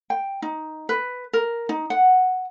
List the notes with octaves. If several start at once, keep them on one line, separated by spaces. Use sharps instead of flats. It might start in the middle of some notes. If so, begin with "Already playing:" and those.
G5
D#4
B4
A#4
D#4
F#5